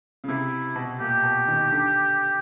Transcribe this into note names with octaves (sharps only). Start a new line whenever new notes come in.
C#3
C3 E4
B2
A#2 G4
B2
D#3
D3